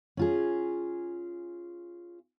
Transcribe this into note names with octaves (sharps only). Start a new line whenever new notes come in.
C#4 F4 G#4